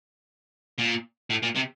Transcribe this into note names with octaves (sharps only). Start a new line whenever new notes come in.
A#2
A2
A#2
C3